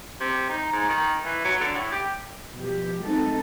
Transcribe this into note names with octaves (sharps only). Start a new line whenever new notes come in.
C3
D#4
G#2
D#3
E3
F#3
D3
A2
G4
B2 F3 G4
G#3 A3 C4 D#4 A4